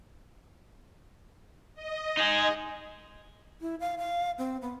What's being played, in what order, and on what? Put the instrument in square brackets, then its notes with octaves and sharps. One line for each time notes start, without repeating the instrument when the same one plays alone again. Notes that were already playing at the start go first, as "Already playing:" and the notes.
[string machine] D#5
[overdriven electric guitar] D#4 G#4
[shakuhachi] E4
F5
F5
C4
B3